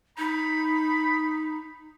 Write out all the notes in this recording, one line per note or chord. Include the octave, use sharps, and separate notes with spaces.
D#4 B5